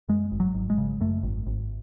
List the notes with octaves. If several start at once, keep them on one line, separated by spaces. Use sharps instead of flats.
F#2 G#3
G#1
F#3
G#1
G#3
C#3
F#2 A3
G#1
G#1